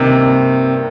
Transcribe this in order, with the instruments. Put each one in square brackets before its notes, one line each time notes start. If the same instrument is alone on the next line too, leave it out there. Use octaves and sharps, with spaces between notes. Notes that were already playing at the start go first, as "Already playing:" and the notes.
Already playing: [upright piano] G2 D#3 A#3 D#4 [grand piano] C3